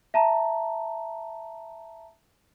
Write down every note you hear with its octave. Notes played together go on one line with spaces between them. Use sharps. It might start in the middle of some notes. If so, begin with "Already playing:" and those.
E5 A5 A#5